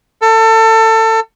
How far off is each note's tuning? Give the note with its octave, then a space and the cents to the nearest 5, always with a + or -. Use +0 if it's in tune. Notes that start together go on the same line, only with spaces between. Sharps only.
A4 +25